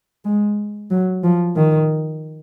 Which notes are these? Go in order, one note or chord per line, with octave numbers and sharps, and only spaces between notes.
G#3
F#3
F3
D#3